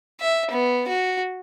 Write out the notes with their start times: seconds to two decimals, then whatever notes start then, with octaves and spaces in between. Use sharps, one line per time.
0.21 E5
0.51 B3
0.88 F#4